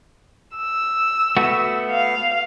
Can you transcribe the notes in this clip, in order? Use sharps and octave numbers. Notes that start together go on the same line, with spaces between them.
E6
A3 B3 F#4
F5